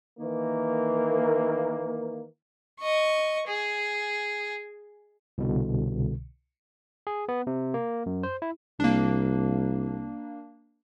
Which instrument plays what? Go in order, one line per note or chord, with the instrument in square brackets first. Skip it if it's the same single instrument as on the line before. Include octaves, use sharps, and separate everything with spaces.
[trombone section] D#3 E3 A#3
[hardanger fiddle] D#5 C#6
G#4
[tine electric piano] C2 B2 D3
G#4
B3
C3
A#3
F#2
C5
E4
[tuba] C2 [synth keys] A#3 D4